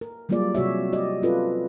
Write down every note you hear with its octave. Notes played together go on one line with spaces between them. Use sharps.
A#4
F#3 G3 A#3 F4 G#4 D5
C3 F#4 C#5 E5
F#4 G4 D5 D#5
C4 C#4 F4 A4 B4